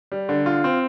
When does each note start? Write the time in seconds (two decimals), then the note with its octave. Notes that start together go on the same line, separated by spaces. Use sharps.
0.12 G3
0.29 D3
0.46 F4
0.64 C4